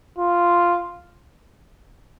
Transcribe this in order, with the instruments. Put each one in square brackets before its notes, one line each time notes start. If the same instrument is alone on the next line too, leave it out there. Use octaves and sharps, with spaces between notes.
[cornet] F4